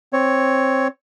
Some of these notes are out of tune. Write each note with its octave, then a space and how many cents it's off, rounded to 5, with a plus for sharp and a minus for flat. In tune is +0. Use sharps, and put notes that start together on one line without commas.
C4 +10 C#5 +5